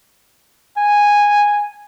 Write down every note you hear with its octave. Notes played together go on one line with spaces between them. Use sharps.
G#5